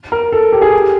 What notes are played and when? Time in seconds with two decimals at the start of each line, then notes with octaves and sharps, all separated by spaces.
0.12 A#4
0.32 A4
0.53 G4
0.62 G#4
0.71 G4